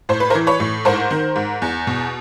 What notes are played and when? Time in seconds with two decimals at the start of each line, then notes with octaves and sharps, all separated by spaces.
0.09 A2 C5
0.20 B4
0.30 A#4 C5
0.35 E3
0.47 B4 C#5
0.60 A2
0.85 G#2 A#4 C5
1.11 D#3
1.36 G#2
1.62 E2
1.87 B2